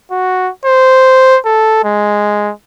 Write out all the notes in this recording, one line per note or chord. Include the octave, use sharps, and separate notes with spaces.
F#4
C5
A4
G#3